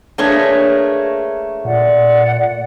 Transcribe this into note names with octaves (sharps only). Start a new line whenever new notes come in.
A3 A#3 D4 G#4 B4 C#5
A#2 D5 F#5